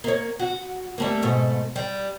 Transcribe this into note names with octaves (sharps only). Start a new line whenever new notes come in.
A#3 C#5
F#4
G3 A3 A#3
G#2 B2 A3
G3